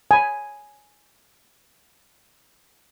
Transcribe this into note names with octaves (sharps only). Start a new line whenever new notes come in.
G#5 B5